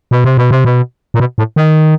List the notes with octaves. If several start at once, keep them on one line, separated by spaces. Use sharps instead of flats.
B2
C3
B2
C3
B2
A#2
B2
A2
D#3